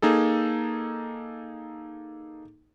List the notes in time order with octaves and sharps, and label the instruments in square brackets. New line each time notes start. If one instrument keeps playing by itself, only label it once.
[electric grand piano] A#3 D#4 G#4 A4